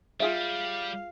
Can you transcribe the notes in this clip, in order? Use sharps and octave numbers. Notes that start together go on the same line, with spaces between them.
G3 F4 G#4 E5 F5